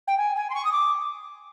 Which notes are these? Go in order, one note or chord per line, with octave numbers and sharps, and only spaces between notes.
G5
G#5
G#5
C6
C#6
D#6
D6